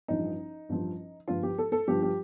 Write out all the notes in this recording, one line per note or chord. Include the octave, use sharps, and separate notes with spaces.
A1 G2 F3 D#4
A1 G2 F3
G1 G2 F3 F4
G4
A4
A4
G1 G2 F3 G4
G4